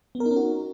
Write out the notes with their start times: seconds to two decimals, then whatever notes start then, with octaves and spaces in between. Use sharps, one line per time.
0.15 B3
0.20 A#4
0.26 D#4
0.31 C#4
0.36 F#4